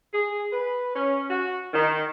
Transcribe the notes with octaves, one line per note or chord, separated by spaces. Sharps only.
G#4
B4
C#4
F#4
D#3